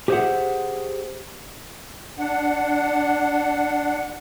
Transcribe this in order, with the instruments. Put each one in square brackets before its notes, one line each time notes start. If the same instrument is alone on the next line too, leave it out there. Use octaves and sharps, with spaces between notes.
[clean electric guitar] G4 G#4 C5 D#5 E5 F#5
[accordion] D4 F#5